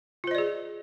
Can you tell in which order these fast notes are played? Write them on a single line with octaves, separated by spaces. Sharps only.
F4 C5 D#5 D5 G#4